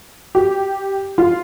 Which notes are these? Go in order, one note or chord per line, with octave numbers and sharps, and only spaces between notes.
G4
F4